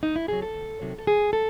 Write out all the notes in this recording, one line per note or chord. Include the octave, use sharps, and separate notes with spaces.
D2 D#4
E4
C3 D#3 F#3 G#4
A4
D2
C3 D#3 F#3
A4
D2 G#4
F#3 A4